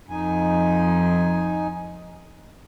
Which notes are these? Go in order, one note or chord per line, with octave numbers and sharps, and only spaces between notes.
F2 D#4 G#5